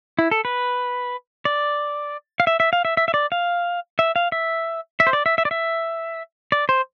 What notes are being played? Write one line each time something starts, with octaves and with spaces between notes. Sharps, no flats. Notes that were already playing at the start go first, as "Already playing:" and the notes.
E4
A4
B4
D5
F5
E5
E5
F5
E5
E5
E5
D5
F5
E5
F5
E5
E5
C5
D5
E5
E5
D5
E5
D5
C5